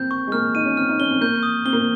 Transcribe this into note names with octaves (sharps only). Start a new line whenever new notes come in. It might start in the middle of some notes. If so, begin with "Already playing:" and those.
Already playing: A#3 C4 G6
C#6
G#3
A#3 F6
D#4 D#7
C#4
C4 F6
D#4
C#4 G7
C4
A#3 G6
D#6
C4 G7
A#3
C4